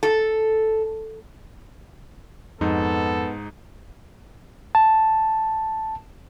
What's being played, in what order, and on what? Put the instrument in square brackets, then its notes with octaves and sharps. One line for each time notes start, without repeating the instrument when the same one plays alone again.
[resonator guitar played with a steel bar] A4
[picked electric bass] F2 [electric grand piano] G#2 D#4 [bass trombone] B3 [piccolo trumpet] A4
[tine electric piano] A5